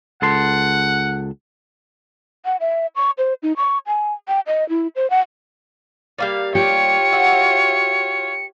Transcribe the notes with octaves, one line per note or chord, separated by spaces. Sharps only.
C#2 A4 F#5 C6
F#5
E5
C#6
C5
D#4
C#6
G#5
G5
D#5
E4
C5
F#5
G3 A#3 D5 F5
F4 G4 C#5 C#7
F#4 E5 F#5